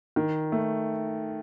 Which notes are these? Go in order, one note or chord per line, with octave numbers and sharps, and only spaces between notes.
D#3
A3